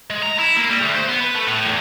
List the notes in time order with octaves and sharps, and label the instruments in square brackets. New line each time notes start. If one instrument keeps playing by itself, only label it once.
[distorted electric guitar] G#3
A#5
E4
A#3
G3
D2
C5
B3
B4
A3
A2
E2